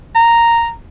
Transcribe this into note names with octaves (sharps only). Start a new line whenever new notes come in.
A#5